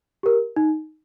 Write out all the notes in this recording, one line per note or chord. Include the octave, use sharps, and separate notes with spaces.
G4 A#4
D#4